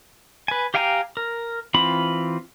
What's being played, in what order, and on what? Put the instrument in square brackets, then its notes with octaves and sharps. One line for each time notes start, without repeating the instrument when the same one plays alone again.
[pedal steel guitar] B4 G#5
G4 F5 G5 G#5 A#5
A#4
E3 C4 F4 B5